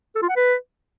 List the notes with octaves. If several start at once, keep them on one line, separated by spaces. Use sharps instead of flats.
A4
F4
F#5
B4